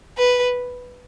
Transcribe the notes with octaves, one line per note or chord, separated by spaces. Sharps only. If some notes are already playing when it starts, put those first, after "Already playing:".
B4